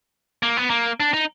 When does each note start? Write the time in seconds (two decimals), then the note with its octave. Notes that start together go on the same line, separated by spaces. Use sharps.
0.43 A#3
0.57 B3
0.70 A#3
1.00 D4
1.14 D#4